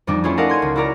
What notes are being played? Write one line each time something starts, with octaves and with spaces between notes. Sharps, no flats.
F2 G3 D4 D#4
A3 C#4 E4 F4 G#4
A4 A#4 D5 D#5 F5 F#5
C6 G#6 C#7 D#7
C#2
E4 F#4 A#4 D5 A#5